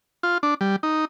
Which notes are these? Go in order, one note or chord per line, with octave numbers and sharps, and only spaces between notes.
F4
D4
G3
D#4